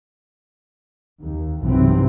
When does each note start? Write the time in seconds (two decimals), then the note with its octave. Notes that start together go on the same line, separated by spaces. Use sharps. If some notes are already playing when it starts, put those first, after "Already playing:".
1.21 D#2
1.62 B1 G2 C3 E3 C4